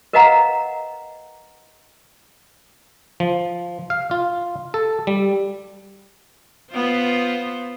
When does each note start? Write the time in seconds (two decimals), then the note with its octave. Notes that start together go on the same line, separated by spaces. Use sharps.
0.13 A#4 B4 D#5 F5 F#5 A#5
3.20 F3
3.90 F5
4.11 F4
4.74 A4
5.07 G3
6.72 B3 F4 C5